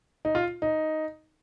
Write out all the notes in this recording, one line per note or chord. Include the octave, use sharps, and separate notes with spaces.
D#4
F4
D#4